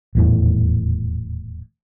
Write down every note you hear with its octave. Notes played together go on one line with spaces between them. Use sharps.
D#1 E2 A2